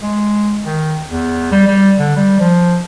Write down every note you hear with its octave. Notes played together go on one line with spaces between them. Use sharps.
G#3
D#3
E2
G3
G3
D3
G3
F3